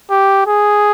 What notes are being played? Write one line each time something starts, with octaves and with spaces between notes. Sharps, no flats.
G4
G#4